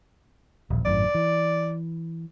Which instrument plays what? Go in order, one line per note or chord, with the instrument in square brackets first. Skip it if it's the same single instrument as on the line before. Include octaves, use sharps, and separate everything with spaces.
[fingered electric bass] D#1 A#1
[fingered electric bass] G#1 F#2 A2 [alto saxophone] D5
[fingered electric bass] E3